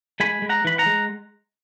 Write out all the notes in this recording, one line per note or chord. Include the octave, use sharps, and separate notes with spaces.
G#3 G#5 B5
G#3
F#5 A#5
E3 B5
F#5 A#5
G#3